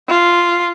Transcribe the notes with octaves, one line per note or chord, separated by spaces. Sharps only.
F4